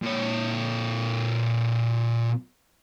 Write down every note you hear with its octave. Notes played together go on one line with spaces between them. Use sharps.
A#2 C#5